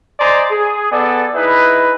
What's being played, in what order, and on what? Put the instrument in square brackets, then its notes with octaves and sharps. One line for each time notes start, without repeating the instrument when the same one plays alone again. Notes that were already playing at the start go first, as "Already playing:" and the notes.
[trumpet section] C5 D5 D#5 G#5 A#5 C6
G#4
B3 G#4 A4 D5
D#4 E4 G#4 B4